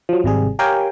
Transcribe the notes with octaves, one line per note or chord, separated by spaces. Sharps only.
F3 F#3
G#1 C3 G3 G#4
G4 A#4 C#5 F5 G5 G#5